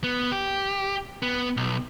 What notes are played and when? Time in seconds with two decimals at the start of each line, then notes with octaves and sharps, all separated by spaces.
0.04 B3
0.32 G4
1.22 B3
1.57 B1